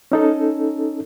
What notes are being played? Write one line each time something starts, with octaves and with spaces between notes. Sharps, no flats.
C#4 D#4 A4